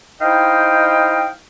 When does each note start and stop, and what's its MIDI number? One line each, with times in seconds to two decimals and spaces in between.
0.21 1.30 63
0.21 1.30 64
0.21 1.30 72
0.21 1.30 75
0.21 1.30 77
0.21 1.30 79